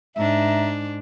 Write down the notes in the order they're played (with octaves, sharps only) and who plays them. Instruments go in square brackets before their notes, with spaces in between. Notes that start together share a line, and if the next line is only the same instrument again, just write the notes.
[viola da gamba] G#2 D4 [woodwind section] E5 A#5